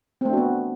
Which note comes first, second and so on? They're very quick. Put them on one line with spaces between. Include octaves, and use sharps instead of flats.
C4 A3 D4 F#4 B3